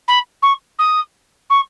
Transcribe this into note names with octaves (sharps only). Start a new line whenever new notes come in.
B5
C#6
D#6
C#6